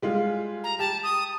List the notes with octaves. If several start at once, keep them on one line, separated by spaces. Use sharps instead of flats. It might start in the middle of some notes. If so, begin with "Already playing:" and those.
G3 G#3 F4
A#5
G4 A5
D#6